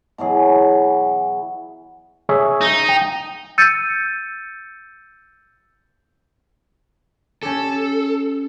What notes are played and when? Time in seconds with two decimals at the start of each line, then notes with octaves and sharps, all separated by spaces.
0.18 B2 E3 F#3 G#4
2.29 G#4 C#5 E5
2.61 D#4
2.89 G5
3.58 E6 G6 A6 C#7 D#7
7.43 C#4 G4 A4